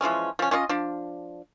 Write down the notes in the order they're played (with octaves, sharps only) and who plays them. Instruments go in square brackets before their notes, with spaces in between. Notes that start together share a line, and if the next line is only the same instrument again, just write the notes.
[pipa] E3 F3 G#3 C#4
F3 C#4
C#4 F4 D5 D#5
F3 D4